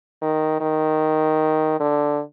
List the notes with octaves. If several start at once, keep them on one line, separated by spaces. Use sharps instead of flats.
D#3
D#3
D3